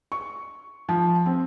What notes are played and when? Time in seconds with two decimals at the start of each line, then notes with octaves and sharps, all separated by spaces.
0.12 C#6
0.89 F3
1.26 C4